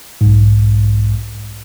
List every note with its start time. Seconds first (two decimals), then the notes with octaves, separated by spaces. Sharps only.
0.21 B1 G#2